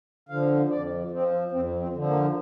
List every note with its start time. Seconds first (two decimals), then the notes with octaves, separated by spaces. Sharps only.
0.29 D3 F3 F5
0.70 F2 D5
1.11 F3 C4
1.52 F2 C4
1.79 C4
1.93 D3 F3
2.07 A#3